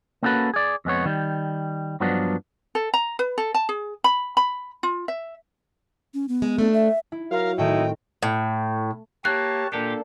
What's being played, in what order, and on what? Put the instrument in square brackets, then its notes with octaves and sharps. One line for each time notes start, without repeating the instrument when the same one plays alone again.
[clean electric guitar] A#3 B3 C#4 F#4 A4 B4
G#4 D5
F2 G#3 B3 C#5
D#3 G3
G2 F3 F#3 B3 D4
[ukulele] A4
A#5
B4
A4
A5
G#4
B5
B5
F4
E5
[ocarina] C#4
B3
[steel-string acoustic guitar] G#3
A3 D4
[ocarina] E5
[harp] E4
[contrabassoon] F#3 [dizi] A#4 [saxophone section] F5
[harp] A2 D#3 A3 [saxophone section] D#4 E4 [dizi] G5
[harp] C4
[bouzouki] A2
[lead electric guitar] A#3 [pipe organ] G4 C#5 A5 [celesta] F#6
[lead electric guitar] A#2 G4 [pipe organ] A#3 D4 A4